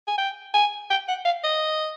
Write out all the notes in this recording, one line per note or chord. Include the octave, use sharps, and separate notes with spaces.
G#5
G5
G#5
G5
F#5
F5
D#5